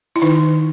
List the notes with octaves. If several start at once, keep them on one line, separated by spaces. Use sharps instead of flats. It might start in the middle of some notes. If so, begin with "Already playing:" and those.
E4
D#3 D#4